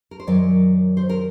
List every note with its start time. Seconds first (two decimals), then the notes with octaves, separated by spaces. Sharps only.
0.11 A#4
0.20 C5
0.27 F#2 D#3 F#3 D5
0.97 C5
1.09 A#4